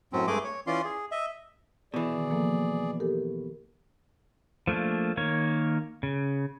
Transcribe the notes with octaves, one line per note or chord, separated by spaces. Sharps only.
F#2 A2 F#3 C4 C#4
G2 G#3 A3 G#4 D#5 D6
C#5
E3 C#4 F4 D5 C6
G#4
D#5 E5
B2 E3 G#4 D5
D#3
F3 A#3 A4
G4 A4 A#4
F3 A3 A#3 D4
D#3 A#3 C#5
C#3